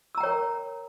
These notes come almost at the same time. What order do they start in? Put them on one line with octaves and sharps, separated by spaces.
E6 A#5 G5 C#5 A#4